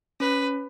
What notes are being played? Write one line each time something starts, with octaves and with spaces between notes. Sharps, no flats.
C#4 B4